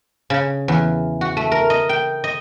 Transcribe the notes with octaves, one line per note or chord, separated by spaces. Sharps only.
C#3
E2
F#4
A3
A#4
D#5
G5
D#5